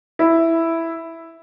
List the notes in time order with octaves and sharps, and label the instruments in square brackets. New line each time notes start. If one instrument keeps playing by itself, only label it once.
[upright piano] E4